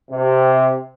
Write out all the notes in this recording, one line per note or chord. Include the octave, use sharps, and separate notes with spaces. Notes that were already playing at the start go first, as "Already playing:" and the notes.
C3